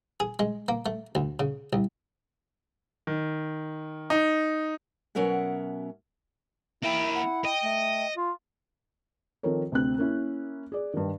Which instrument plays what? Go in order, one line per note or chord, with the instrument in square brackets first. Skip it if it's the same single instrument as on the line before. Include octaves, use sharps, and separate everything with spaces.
[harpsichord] G#4
G#3
A#3
A3
D2
C#3
C2
[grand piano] D#3
D#4
[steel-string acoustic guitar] B2 F#3 C#4 A#4 E5 F#5
[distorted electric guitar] A#3 G5 [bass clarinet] E4 [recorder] E5
[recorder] F#5
[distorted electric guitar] D#5 [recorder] G5
[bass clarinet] A3
F4
[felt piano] D#3 F3 C4 A4 A#4 C#5
D2 C3 C4 F#6
A#3 C#4 E4
G#4 D5
G2 D#3